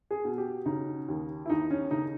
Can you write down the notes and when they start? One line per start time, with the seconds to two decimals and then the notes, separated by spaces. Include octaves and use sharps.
0.11 G#4
0.25 B2
0.38 G4
0.66 C#3 D#4
1.08 D#2
1.46 E4
1.50 D#2 D#4
1.71 C#4
1.91 C#3 D#4